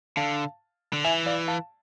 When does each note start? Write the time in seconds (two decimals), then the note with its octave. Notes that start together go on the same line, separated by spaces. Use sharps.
0.17 D3 F5 A5
0.93 D3
1.04 E3 E5 G#5
1.26 D5 F5
1.48 F5 A5